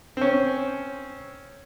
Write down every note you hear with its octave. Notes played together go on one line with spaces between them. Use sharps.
C4 C#4